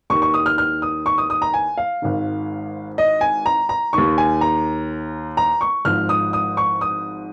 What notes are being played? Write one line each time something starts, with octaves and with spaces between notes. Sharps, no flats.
D#2 D#3 C#6
C#6
D#6
F6
F6
D#6
C#6
D#6
D#6
A#5
G#5
F5
G#1 G#2 D#3
D#5
G#5
A#5
A#5
D#2 D#3 C#6
G#5
A#5
A#5
C#6
G#1 G#2 F3 F6
D#6
D#6
C#6
D#6